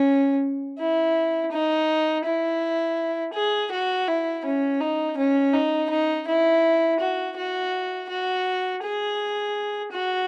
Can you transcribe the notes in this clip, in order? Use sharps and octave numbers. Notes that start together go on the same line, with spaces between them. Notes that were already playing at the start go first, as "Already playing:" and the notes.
Already playing: C#4
E4
D#4
E4
G#4
F#4
E4
C#4
D#4
C#4
D#4
D#4
E4
F#4
F#4
F#4
G#4
F#4